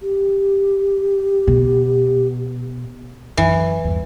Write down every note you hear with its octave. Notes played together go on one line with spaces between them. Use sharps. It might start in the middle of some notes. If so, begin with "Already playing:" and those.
G4
B2
F#2 E3
E2 G2